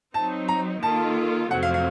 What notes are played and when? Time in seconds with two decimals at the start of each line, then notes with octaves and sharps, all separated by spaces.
0.14 F#3 C4 D#4 A5
0.48 A#5
0.83 D#3 A#3 F4 A4 A5
1.51 F2 C3 F#3 A3 C4 F#5
1.63 F5
1.74 F5